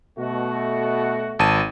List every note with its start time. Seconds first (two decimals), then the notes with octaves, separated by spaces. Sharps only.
0.19 B2 A3 F#4
1.39 G#1 A5 D#7